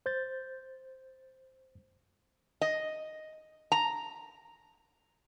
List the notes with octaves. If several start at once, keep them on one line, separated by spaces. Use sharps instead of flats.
C5 G6 A6
D#5
A#5